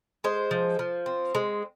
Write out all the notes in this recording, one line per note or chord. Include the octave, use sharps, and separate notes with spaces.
G#3 C5
F3
F3
C4
G#3